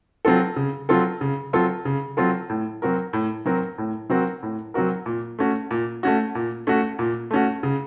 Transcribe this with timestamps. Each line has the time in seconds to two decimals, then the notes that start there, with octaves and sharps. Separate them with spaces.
0.25 F#3 C4 F4 A4
0.56 C#3
0.89 F#3 C4 F4 A4
1.21 C#3
1.53 F#3 C4 F4 A4
1.85 C#3
2.17 F#3 C4 F4 A4
2.50 A2
2.82 F#3 C4 F#4 A#4
3.13 A2
3.46 F#3 C4 F#4 A#4
3.78 A2
4.10 F#3 C4 F#4 A#4
4.43 A2
4.74 F#3 C4 F#4 A#4
5.06 A#2
5.39 A3 C#4 F#4
5.71 A#2
6.03 A3 C#4 F#4
6.35 A#2
6.67 A3 C#4 F#4
6.99 A#2
7.31 A3 C#4 F#4
7.63 C#3